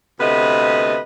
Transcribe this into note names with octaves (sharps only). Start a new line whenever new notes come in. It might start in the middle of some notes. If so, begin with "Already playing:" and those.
D2 C3 A3 B3 B4 D#5